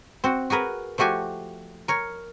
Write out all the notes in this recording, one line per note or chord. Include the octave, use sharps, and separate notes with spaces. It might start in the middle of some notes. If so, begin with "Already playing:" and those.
C4 F#4
F#4 G#4 A#4 B4
F3 A3 F#4 G4 G#5
A#4 C#5